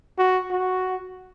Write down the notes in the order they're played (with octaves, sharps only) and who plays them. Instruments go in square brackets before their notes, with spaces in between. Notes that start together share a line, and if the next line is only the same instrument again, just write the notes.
[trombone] F#4
F#4